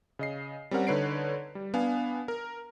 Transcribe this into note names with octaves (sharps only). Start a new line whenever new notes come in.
C#3 D#5 C7
G3 C4 C#4 A#4 F#5
D3 D#4 B4 C#5 C7 D7
G3
B3 D4 F5 G#5
A#4